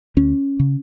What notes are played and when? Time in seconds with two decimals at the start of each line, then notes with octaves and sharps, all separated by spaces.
0.17 D2 C#4
0.59 C#3